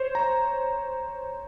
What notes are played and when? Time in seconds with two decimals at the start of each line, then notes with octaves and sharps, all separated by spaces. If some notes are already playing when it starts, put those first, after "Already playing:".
Already playing: C5 C#5
0.15 A#5